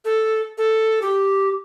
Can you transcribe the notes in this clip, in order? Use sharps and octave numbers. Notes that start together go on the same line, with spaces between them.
A4
A4
G4